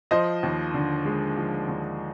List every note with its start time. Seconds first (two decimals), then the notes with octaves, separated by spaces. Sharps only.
0.11 F3 C5 D#5
0.43 D#2
0.74 D3
1.05 G#3
1.37 F3
1.68 D#2